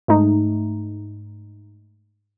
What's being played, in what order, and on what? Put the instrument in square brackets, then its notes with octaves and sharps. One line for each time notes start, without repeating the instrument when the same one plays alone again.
[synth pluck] G#2 A3 D#4